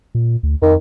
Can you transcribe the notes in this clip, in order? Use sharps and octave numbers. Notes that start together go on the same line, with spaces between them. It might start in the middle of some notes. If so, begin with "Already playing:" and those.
A#2
D2
F2 D#3